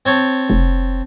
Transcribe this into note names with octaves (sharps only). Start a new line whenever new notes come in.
C4 C#5 A5
F1